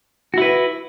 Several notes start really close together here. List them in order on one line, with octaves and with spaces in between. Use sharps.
F#4 E4 B4